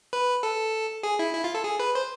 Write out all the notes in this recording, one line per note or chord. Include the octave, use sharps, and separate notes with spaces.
B4
A4
G#4
E4
E4
F4
A4
G#4
B4
C5